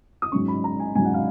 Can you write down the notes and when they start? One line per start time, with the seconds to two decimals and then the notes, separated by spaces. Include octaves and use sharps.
0.22 D#6
0.32 G#2 F#3 C#4 C#6
0.48 B5
0.64 A#5
0.80 G#5
0.95 G#2 F#3 C#4 G#5
1.05 F#5
1.14 F5